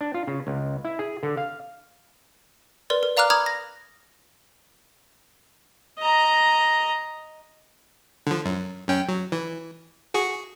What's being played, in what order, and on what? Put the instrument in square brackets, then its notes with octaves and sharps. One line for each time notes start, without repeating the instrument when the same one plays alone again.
[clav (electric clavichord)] D4
F4
C#3
C#2
E4
G#4
D3
F5
[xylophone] A#4 B4 D5 C6
A#4
D5 F5 A#5 D6 F6 F#6
A#5 B5 D6 D#6 F6 G#6
A#6
[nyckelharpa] D#5 A#5
[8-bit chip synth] D3 F3
F#2
F#2 C#4 G5
F#3
E3
F#4 G#4 C#6